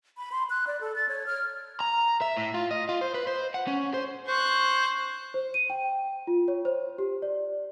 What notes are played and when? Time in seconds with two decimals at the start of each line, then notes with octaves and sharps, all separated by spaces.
0.18 B5
0.32 C6
0.50 F#6
0.67 D5
0.81 A4
0.96 A6
1.09 C#5
1.26 F6
1.80 A#5
2.21 E5
2.37 A2
2.54 F4
2.71 D#5
2.89 F4
3.01 C5
3.14 B4
3.27 C5
3.54 F#5
3.67 C#4
3.94 C5
4.27 C5 C#6 F#6
5.34 C5
5.54 D#7
5.70 G5
6.27 F4
6.48 C#5
6.65 C5
6.98 G4
7.22 D5